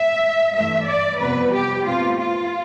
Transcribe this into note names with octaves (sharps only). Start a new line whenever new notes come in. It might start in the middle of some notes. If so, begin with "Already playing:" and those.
Already playing: E5
G2 E3 A3 E5
D5
F2 C3 G3 B3 B4
G4
B2 A3 C4 F4
F4